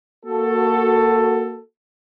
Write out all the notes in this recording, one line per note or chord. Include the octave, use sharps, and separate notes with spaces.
A#3 F#4 A4